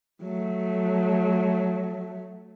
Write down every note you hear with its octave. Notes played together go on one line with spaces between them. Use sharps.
F#3 A3